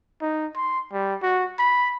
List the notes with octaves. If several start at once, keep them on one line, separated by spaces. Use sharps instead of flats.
D#4
C6
G3
F#4
B5